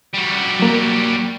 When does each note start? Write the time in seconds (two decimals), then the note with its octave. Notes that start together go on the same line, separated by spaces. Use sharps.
0.14 G3 F#4
0.59 F#3 A#3